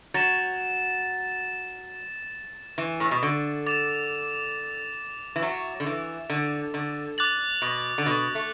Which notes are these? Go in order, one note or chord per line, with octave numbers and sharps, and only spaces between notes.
F#3 A6 E7
E3
A2
B2
D3
D6 A6 E7
E3
F#3
D3
E3
D3
D3
D6 F#6 A6 F#7
B2
D3
B2
A3